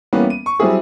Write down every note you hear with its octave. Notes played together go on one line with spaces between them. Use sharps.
E3 G3 A#3 B3 C#4
D#7
C#6
F#3 G3 C4 E4 F#4 G#4